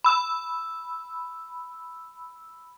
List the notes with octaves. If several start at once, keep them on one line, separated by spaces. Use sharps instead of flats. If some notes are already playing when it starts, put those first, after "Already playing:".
B5 E6